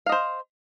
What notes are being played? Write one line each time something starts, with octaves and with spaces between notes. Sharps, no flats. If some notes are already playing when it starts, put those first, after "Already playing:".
C5 D#5 F5